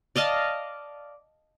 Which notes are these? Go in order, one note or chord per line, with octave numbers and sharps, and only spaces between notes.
D5 D#5 F5 A5